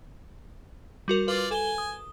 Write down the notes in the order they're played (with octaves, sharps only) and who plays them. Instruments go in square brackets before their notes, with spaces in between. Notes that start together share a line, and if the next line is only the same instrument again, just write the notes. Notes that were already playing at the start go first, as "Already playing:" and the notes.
[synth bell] G3 F#4 A#4
[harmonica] F4 D5 [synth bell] B4
[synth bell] A4 G7 [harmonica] G#5
[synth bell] D#6